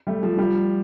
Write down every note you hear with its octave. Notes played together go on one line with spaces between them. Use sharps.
G3 A3
F3 G3
F3 G3